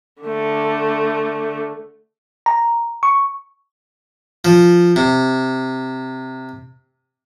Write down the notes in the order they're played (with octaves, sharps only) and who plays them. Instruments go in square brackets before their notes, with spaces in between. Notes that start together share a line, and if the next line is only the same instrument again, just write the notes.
[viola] D3 A3
[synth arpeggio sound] A#5
C#6
[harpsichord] F3
C3